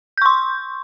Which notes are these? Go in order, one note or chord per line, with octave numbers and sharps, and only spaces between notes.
C6 C#6 G6